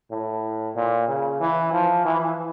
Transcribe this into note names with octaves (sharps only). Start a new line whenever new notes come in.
A2
A#2
C#3
E3
F3
E3